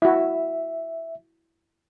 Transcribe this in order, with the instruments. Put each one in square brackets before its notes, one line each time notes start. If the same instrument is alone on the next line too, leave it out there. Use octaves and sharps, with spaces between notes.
[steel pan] E4 F#4 [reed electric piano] E5